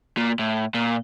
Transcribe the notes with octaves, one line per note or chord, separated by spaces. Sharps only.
A#2
A2
A#2